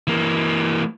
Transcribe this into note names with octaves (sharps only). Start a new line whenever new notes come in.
E3 A#3